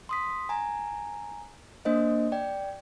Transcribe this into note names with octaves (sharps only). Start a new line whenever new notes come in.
C6 D#6 B6
G#5 A#5
A#3 D4 C5 D#5
D5 G5